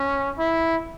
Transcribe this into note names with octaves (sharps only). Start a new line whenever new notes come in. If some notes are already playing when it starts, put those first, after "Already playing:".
Already playing: C#4
E4